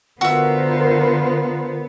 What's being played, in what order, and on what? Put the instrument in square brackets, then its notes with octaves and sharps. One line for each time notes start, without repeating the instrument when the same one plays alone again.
[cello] D3 B3 [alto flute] F4 [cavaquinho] F#4 E5 [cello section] A#4 C5